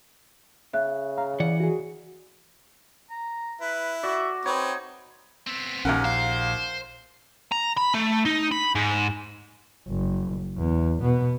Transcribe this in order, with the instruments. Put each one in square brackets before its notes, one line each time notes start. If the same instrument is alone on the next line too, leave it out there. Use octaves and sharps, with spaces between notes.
[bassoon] C#3 [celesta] E5 F#6
[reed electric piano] F5 A#5
[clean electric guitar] E3 F#5 [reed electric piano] D5
[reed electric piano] F#4 G#4
[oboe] A#5
[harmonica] E4 [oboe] B4
[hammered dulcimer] F#4 D5 [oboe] E5
[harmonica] C4 B4 [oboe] D#4 [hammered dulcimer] C#5
[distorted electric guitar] B3 C4
[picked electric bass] A#1 [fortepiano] D#2 A#4 F#5 [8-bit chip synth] C#4
[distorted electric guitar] C5 [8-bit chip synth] F5
[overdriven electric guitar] A#5
B5
A3
D#4
B5
G#2
[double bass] F#1
E2
B2 B3